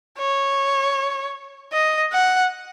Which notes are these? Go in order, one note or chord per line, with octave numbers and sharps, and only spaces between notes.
C#5
D#5
F#5